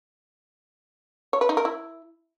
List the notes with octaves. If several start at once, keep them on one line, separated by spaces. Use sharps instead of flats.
C#5
B4
D#4
A#4
E4